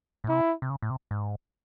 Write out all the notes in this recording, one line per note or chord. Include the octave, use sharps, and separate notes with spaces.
A2
C3 E4
C3
C#3
A2
C3
G#2